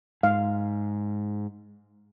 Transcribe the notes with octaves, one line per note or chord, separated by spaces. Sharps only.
G#2 F5